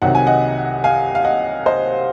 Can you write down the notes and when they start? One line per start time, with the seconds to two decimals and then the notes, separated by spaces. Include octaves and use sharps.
0.02 C2 C3 D#3 F#3 F#5
0.15 G#5
0.27 D#5 F#5
0.84 F5 G#5
1.15 F5
1.25 D#5 F#5
1.66 C5 D#5